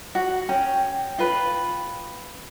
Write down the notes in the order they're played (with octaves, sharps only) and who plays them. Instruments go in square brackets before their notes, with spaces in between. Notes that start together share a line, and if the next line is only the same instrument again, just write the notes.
[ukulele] F#4
[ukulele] C#4 [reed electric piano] G5
[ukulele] F4 B4